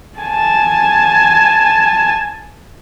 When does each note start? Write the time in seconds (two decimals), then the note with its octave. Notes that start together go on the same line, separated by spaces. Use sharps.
0.19 G#5 A5